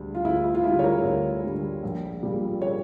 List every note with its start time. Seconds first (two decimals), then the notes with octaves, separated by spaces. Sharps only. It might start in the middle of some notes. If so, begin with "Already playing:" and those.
Already playing: D2 D3 G3
0.15 F4
0.24 D2 E4
0.44 E4
0.55 F4
0.64 D3 E4
0.68 G3
0.79 C#5
0.83 A#4
1.03 D2 C#5
1.44 D3 G3
1.83 A#1
2.23 A#2 G3
2.62 C#5